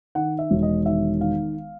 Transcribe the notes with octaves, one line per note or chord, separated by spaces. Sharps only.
D#3 F#5
E5
E1
D#5
D#3 E5
D#3 F5